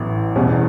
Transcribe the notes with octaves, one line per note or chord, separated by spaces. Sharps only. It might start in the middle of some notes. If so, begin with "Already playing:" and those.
Already playing: A1 A2 F#3 B3 E4
E2 B2 G3 C#4